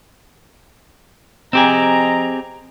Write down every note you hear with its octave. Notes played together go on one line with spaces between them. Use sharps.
F3 C4 G4 G#4 D#5 A#5